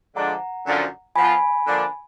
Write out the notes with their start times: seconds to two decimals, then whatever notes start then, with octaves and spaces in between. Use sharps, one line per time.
0.16 D3 F3 G#3 D4 F#5 A#5
0.66 F#2 D3 F3
1.16 F3 B3 F4 G#5 B5
1.65 D3 F3 A#3 D4